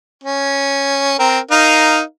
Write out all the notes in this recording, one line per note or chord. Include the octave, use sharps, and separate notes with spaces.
C#4
C4 A#4
D#4 A#4 F5